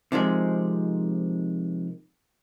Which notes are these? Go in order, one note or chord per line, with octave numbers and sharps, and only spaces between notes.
C3 D#3 F3 G#3